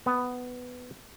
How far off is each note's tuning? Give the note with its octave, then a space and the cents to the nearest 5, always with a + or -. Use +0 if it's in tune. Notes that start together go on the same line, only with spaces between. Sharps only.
B3 +10